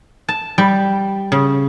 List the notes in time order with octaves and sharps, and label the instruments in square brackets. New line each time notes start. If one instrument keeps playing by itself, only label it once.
[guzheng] A5
G3
C#3